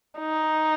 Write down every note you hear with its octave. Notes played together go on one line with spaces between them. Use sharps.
D#4